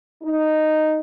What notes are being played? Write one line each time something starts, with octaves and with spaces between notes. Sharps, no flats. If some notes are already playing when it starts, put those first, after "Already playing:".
D#4